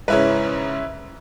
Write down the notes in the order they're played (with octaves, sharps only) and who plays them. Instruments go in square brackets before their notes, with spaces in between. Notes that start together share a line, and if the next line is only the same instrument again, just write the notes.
[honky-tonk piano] G#2 C#3 [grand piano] C#4 E4 B4